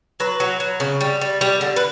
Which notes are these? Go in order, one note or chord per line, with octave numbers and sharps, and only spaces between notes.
F#3 B4
F#3
F#3
C#3
G3
G3
G3
D3
B4